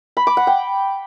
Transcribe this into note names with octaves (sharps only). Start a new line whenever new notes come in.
B5
D6
F#5
G5